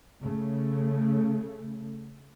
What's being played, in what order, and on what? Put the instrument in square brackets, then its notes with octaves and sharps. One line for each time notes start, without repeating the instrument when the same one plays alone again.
[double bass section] C#3 A3